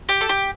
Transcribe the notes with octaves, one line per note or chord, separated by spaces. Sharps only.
G4
A4
G4